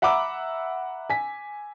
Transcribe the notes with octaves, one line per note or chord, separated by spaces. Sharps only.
E5 F#5 A#5 B5 D6 E6
G#5 B6